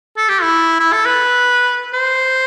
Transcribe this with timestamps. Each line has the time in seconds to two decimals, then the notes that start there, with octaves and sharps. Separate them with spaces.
0.17 A4
0.29 G4
0.42 E4
0.80 E4
0.93 A4
1.06 B4
1.94 C5